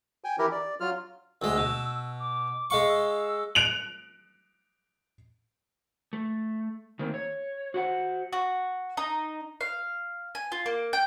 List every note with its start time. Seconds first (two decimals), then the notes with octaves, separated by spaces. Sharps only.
0.24 G5 G#5
0.39 E3 E4 G4 A#4
0.52 D5
0.80 F#3 F4 F6
1.42 D2 G#3 E6
1.57 B2
2.20 D6
2.70 G#3 F5 C#6
2.89 E6
3.55 F#6 D7 F7 F#7
6.13 A3
6.99 D#3 A3 A#3 C4
7.14 C#5
7.74 F#4 C5 F#5
8.33 F#4
8.97 D#4
9.61 F5
10.35 G#5
10.52 F4
10.66 A#3
10.93 G5